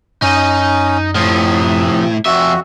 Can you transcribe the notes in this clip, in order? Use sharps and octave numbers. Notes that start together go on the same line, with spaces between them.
F#2 C#4 D#4 D#5
A2 C3 F3 D#6
F2 F#4 E5